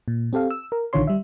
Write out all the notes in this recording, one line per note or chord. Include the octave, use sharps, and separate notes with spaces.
A#2
C4 G4 A4 F5
E6
A#4
A#1 D3 D#3 F4 C#5 C6
G3 E5